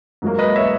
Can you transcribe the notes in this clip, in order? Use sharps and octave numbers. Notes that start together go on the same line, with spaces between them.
G#2 F#3 A#3
B4 D#5
C#5 E5